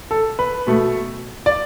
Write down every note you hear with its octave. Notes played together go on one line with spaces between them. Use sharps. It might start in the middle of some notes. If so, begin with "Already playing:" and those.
A4
B4
B2 A3
D5